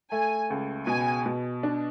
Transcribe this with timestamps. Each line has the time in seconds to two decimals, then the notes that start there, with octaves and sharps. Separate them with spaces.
0.11 A3 G#5
0.50 C#2
0.87 B2 G#5
1.26 B2
1.63 D4